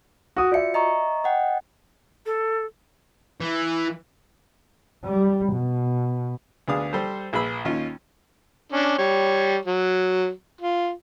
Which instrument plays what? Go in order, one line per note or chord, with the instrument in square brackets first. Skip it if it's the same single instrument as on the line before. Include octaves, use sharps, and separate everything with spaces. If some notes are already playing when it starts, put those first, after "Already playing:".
[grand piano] F#4 D#6
[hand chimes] F4 F#4 C#7 [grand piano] D5 E5
[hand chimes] D#5 A#5 C#6
D#5 F#5 G5
[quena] A4
[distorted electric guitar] E3
[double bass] G3
B2
[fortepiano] D2 B3 D4 G#4 F5 D#6
G3 A4 C5
A#1 G#4 B4 B5 E6
D#2 C#4 D#4 F4
[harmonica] C#4 D4
G3 C#5
F#3
F4